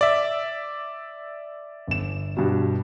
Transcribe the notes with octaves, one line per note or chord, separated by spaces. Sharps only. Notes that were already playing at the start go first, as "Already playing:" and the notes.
D5 E5
G1 E7
G2 B2